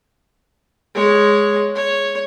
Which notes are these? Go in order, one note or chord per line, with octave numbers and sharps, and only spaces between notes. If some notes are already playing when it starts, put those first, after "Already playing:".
G#3 C#5
C#5